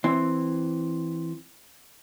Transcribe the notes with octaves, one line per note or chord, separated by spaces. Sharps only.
E3 C4